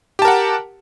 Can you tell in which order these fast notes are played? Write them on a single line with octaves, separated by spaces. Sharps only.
G4 A5 A#4 F#5